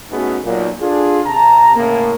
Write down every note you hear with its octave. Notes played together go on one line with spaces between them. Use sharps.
A3 B3 C#4 D#4 F#4 G#4
B1 A#2
D4 F4 G#4 A4
C3 A5 A#5
A2 C#3 A#3